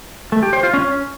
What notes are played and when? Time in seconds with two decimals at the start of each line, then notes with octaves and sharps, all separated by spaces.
0.32 A3
0.43 G4
0.53 C5
0.63 F4
0.74 C#4